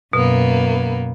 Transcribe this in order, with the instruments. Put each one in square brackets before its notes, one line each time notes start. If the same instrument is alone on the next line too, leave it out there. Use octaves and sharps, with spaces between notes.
[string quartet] F#2 A#3 B3 [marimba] B2